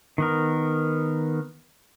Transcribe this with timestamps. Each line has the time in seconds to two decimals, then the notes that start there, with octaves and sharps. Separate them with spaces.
0.18 D#3 B3 A#4